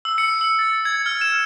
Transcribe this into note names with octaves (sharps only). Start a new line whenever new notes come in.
E6
C#7
E6
A6
G#6
F6
E7